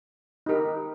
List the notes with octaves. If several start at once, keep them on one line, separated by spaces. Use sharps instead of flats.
D#4 G4 A#4